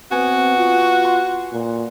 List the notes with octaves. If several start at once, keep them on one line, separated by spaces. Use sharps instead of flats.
B3 C4 F#4 G#5
F4
F#5 C6
A#2